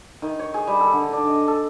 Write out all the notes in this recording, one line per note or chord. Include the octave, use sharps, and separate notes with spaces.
D#3
C#5
G#4
G3
A4
D3
D4
D#5
A4